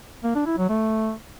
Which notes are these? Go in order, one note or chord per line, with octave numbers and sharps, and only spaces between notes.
A#3
D4
E4
F#3
A3